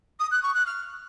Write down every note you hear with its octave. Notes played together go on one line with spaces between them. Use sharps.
D#6
F#6
C#6
F#6
F6